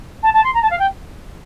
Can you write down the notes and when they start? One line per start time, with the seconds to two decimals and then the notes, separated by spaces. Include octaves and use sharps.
0.23 A5
0.34 A5
0.44 C6
0.54 A#5
0.62 A5
0.70 F5
0.79 G5